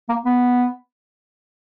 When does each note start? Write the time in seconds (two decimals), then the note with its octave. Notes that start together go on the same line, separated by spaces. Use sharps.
0.09 A#3
0.26 B3